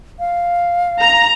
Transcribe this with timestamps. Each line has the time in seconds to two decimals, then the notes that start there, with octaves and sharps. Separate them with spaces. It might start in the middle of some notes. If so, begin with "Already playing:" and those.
0.19 F5
1.00 A#5